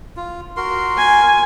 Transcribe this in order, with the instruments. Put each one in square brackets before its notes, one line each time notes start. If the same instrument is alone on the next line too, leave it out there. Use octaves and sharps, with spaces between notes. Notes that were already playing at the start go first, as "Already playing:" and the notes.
[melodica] F4
F#4 A#4 C6
[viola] G#5